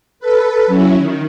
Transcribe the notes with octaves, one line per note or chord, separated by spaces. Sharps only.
A4 B4
F#3 C#4 E4
D#3